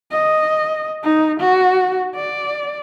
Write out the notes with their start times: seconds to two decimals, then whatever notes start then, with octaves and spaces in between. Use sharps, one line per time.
0.12 D#5
1.04 D#4
1.40 F#4
2.15 D5